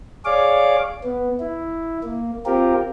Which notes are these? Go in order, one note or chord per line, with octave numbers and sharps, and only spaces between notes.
G#4 C#5 D5 F5 D6
B3
E4
A#3
C4 F4 G4 A#4